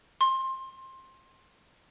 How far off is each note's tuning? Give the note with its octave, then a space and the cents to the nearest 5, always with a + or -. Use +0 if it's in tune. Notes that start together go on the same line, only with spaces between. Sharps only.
C6 +20